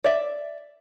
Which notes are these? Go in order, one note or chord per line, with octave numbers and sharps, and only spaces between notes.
D5 E5